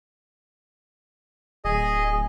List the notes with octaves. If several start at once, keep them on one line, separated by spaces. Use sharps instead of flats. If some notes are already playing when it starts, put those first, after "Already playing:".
D1 G#4 D#5